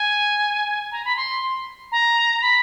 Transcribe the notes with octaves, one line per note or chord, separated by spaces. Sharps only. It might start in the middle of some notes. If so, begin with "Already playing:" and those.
Already playing: G#5
A#5
B5
C6
A#5
B5